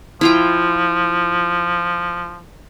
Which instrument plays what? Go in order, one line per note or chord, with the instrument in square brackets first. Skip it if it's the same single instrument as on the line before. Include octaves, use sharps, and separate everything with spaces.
[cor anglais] F3 [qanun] E4 F4 G5